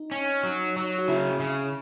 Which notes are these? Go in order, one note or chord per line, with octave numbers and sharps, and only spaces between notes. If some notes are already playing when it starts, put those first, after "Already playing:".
Already playing: D#4
C#4
F#3
F#3
F#4
C#3 E4
C#3